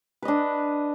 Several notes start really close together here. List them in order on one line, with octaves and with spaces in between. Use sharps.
B4 D#5 D4